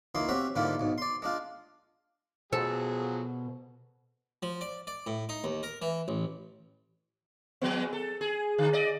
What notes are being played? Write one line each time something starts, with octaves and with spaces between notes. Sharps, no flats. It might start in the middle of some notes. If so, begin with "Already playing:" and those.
C#2 A#3 D#4 E4 C6
C4 C#4 F#4 G4 E5
G#2 D3 G3 A#3 E4 F4
B1 G#2
D5 C6
G#3 D4 F4
B2 F3 F#3 G#4 A4 C5
F3
D5
D5
A2
D#4
D#2
A#4
E3
A1
F3 G#3 B3
A4
G#4
D3
D5 D#5